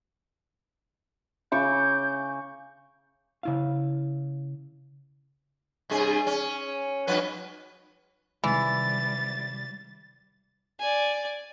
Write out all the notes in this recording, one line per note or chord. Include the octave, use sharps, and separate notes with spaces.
C#3 C#6 D6 G6
C#3 E4 F5
G2 C3 G#4
C#4
G2 F3 B4
C3 D#3 E3 G3 G#3 A6
D5 G#5